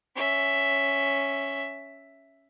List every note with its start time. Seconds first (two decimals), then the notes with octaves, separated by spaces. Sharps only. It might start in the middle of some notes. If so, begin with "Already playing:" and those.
0.15 C#4 E5